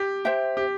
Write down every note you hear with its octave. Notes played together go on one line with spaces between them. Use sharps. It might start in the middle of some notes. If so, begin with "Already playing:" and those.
Already playing: G4
C5 E5 G5
G4